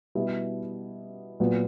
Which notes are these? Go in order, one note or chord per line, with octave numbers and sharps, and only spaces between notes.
B2 G3 B3 E4
A#2 F#3 B3